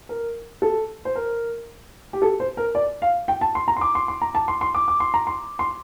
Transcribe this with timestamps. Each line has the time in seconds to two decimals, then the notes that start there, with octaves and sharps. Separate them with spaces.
0.09 A#4
0.62 A4
1.05 C5
1.15 A#4
2.13 G4
2.22 A4
2.40 C5
2.57 A#4
2.75 D5
3.02 F5
3.28 G5
3.41 A5
3.55 C6
3.68 A#5
3.76 C6
3.81 D6
3.95 C6
4.08 C6
4.22 A#5
4.35 A5
4.48 C6
4.61 C6
4.74 D6
4.88 D6
5.00 C6
5.14 A#5
5.27 C6
5.59 C6